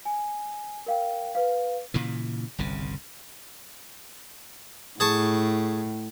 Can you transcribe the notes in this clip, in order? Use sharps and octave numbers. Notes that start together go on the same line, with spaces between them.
G#5
A#4 F5 G5
B4 F5
A#2 C#3 E3
G1 C2 C#3
A2 G#4 A5 C#6